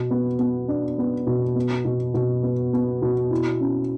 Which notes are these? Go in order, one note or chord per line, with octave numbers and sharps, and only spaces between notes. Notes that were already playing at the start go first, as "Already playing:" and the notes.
Already playing: B2
B3
B3
D4
B3
B2
B3
B2
B2
B3
B3
B2
E4
C#4